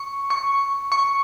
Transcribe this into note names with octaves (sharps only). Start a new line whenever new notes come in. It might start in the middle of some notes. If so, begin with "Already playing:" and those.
Already playing: C#6
C#6
C#6